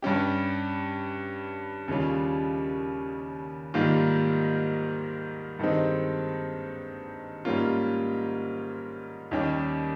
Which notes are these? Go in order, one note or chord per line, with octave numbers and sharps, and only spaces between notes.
G2 G3 C#4 G4
D#2 C#3 G3 C#4 F4
G#2 D#3 G3 A#3 F4
G2 D#3 G#3 C4 D#4
G#2 G3 A#3 C#4 F4
D#2 D#3 G3 C#4 G4